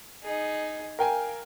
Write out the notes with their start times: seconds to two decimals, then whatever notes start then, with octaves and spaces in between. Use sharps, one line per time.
0.23 D#4 G#4
0.99 A#4 F5 G5 G#5